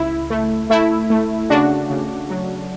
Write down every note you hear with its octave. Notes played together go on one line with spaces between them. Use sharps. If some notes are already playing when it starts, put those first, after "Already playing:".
Already playing: C#2 E4
A3
A3 E4
A3
C#3 D4 F#4
C#3
F#3